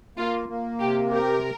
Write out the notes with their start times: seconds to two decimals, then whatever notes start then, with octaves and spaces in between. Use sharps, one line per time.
0.17 A#3 F4
0.49 A#3
0.80 C3 G4
1.11 G4 A#4